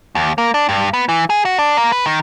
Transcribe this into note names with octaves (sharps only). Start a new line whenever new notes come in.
D#2
A#3
D4
G2
B3
E3
G#4
F#4
D4
A#3
B4
D#3